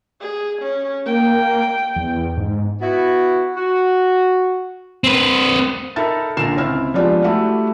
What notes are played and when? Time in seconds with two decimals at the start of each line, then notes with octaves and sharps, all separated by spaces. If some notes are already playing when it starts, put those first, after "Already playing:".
0.21 G#4
0.62 C#4
1.06 A#3 G5
1.96 E2
2.37 G#2
2.81 B3 E4 F#4
3.55 F#4
5.04 C4 B4
5.96 D#4 A4 A#4 E5 B5 A6
6.37 A#1 A#2 D3 A#4 C7 E7
6.56 C#2 C4 E4 F6
6.94 F3 G#3 B3 D4 F4 G4
7.24 G3 A3 E4 F#4 G4